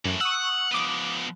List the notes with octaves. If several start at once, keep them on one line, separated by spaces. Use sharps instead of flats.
F#2 A2 E3
F#5 C#6 D#6 E6
F3 B3 D6 D#6